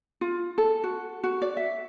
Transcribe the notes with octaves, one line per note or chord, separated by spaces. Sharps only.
F4
A4
F#4
F#4
D5
E5